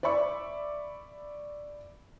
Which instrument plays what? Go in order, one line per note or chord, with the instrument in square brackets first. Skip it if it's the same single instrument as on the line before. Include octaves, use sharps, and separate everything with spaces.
[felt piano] D5 E5 B5 C#6 D6